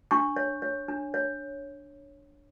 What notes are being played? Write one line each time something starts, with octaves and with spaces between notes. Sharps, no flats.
D4 C#6
C#5
C#5
D4
C#5